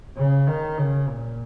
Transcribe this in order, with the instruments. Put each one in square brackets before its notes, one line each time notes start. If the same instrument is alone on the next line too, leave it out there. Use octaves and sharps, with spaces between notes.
[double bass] C#3
D#3
C#3
A#2